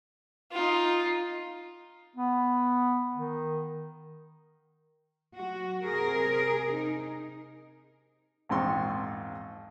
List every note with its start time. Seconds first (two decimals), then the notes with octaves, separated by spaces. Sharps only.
0.52 D#4 F4
2.16 B3
3.15 D#3
5.35 F#3 F#4
5.86 C3 G#4 A#4
6.76 D#4
8.49 A#1 E2 G#2 C4 C6 C#6